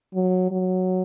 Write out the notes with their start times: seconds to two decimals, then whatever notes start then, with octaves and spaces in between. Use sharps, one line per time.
0.14 F#3
0.51 F#3